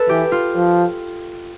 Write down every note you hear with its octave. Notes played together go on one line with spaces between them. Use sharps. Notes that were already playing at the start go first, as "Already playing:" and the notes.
Already playing: A4 B4
E3 G4
F4
F3